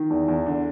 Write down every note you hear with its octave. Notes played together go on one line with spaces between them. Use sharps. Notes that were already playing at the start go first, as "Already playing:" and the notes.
Already playing: D#3
E2
E2
D3